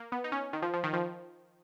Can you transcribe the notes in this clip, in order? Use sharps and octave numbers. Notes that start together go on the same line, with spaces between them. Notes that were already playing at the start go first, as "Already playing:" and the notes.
Already playing: A#3
B3
D#4
C#4
D#3
F3
F3
D#3
F3